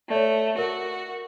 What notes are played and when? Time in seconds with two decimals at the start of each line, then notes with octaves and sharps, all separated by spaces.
0.11 A3 C#5 D5
0.58 F#4 A#4